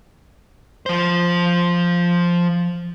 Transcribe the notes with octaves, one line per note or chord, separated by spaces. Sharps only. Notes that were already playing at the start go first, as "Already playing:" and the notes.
F3 C5